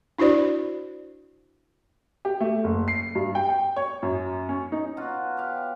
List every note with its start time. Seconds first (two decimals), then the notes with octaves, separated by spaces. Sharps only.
0.18 D4 E4 F#4 C5 D5
2.25 G4
2.40 A3
2.64 F#1
2.88 C7
3.15 G2
3.35 G5
3.49 G5
3.76 C#5
4.03 F#2
4.49 C#4
4.72 D#4
4.97 B2 F#3 F4 F#4
5.37 G4 F5